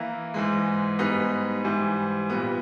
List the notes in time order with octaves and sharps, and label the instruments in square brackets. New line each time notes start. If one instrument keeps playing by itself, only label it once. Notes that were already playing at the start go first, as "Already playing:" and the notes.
Already playing: [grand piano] E3 A#3 E4 A#4
G#2 E3 G#3
G#2 G3 B3 D#4
G#2 E3 G3
A#2 G3 B3